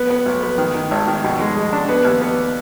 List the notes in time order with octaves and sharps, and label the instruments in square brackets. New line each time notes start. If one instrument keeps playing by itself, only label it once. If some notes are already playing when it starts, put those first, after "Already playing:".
Already playing: [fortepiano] B3
B3
B1
B3
D#3
D#3
G#1
D#3
B2
G#3
G#3
D4
B3
D#2
B3